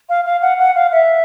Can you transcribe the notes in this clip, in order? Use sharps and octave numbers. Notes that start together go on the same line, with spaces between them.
F5
F5
F#5
F#5
F5
E5